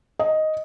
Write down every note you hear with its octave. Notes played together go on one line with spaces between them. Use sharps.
D#5